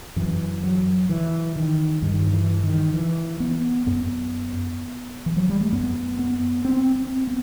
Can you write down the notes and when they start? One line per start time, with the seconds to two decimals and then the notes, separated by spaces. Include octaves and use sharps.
0.16 F#2 E3
0.63 F#3
1.09 E3
1.56 D#3
2.02 G2 D#3
2.33 E3
2.63 D#3
2.94 E3
3.40 B3
3.86 F#2 B3
5.26 E3
5.37 F#3
5.49 G3
5.60 A3
5.72 F#2 B3
6.19 B3
6.65 C4
6.95 C4
7.27 B3